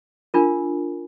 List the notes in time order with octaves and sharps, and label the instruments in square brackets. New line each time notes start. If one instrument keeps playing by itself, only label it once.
[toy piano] D4 F4 A#4